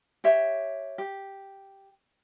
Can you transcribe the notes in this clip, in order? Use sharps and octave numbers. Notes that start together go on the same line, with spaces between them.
G4 C#5 E5
G4